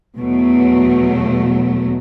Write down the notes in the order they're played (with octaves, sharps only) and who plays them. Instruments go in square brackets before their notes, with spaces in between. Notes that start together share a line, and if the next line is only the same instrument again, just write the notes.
[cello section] E2 B2 F#3 A3